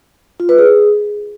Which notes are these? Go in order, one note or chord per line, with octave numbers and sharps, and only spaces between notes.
F4
B4
G#4